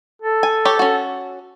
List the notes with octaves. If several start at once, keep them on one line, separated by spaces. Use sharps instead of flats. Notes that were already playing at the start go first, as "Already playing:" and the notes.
A4
G#5
G4 C#5
C#4 F#4